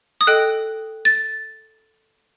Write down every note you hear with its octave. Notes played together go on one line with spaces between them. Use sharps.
D#6
A4 D#5 G5 F#6
A6